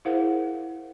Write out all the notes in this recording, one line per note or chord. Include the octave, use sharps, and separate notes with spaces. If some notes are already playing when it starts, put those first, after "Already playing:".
E4 G#4 A#4 C5 F5 F#5